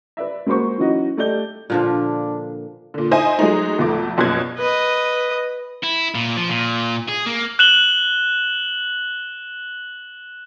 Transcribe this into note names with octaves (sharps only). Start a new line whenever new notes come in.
B4 D5 E5
G#3 A#3 F#4 C5 C#6
E3 F#3 C#4 D#4 F#4 D#5
A3 G4 D5 D#5 G6 G7
A#2 D3 F3 D4
A#2 D3
D#4 E4 C5 D#5 G#5
F#3 G#3 A3 D#4
B1 F2 A3 D6
A#1 F#2 B2 F#6 G#6
B4 D#5
E4
A#2
F3
A#2
G#4
A#3
F#6 E7 F#7 G7